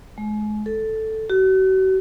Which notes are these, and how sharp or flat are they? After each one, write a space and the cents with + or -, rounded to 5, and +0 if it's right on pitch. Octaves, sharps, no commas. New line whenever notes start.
G#3 +35
A4 +0
F#4 +40